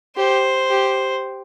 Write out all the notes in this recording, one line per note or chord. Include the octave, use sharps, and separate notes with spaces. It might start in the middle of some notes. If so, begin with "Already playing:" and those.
G4 C5
G4